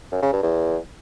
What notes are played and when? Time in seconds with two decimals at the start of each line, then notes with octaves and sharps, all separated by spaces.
0.12 F#2
0.22 C#3
0.33 G2
0.43 E2